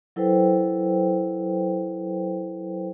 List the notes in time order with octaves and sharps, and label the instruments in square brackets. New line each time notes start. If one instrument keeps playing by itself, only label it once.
[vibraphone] F#3 E4 A4 B4 C5 G5